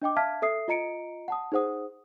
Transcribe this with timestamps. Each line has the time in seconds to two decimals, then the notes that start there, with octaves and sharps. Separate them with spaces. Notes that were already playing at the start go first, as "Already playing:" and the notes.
0.02 D4 D#5 G5 D6
0.16 E5 F5 A5 F6 G#6 B6
0.42 A4 E5 D#6 C7
0.68 F4 D#5 A#5 C#7 D7
1.28 F#5 A5 D#6
1.52 D#4 G#4 C5 F#5 D#6